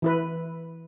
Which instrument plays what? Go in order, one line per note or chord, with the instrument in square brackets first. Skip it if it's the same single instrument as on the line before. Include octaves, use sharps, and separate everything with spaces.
[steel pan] E3 E4 B4